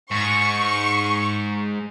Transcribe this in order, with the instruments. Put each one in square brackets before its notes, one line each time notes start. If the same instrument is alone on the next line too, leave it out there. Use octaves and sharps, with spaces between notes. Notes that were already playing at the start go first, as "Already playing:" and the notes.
[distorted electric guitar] G#2 [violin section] C#6